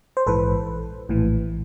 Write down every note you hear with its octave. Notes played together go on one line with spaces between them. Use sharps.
C5
A#1 G#2 E3 A4 B4
A#1 A2 E3